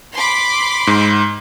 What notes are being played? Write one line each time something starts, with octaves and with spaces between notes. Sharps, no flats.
B5 C6 D6
G#2